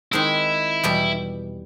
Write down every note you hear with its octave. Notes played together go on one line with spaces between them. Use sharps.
D#3 G#3 C4 D#4 E4
E2 B2 G3